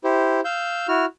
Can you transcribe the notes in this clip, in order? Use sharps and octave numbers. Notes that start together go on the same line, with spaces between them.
E4 G4 C5
F5 E6 G6
E4 F#4 F6